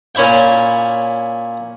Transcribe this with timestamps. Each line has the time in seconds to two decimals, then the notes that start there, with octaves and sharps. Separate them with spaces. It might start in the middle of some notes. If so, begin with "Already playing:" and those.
0.15 A#2 C#4 E4 E5 G5